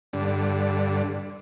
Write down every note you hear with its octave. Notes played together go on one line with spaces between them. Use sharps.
G2 D3